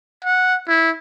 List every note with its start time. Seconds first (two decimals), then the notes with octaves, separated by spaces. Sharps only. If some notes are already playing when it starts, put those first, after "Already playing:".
0.25 F#5
0.68 E4